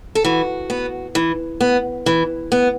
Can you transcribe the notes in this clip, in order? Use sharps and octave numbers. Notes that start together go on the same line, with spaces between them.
A4
E3 F#4
B3
E3
B3
E3
B3